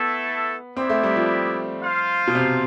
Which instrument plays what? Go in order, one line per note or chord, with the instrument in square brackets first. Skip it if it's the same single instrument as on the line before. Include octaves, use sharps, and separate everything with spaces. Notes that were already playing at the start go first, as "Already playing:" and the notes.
Already playing: [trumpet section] A3 E4 A4 [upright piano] B3
[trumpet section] B3 E4 G4 D5 [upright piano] C4
[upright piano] A3
G3
F3
[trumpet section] F4 C5 F5
[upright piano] B2
C3